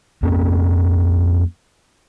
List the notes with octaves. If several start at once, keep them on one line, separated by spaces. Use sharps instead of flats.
F2 A#3 C4 C#4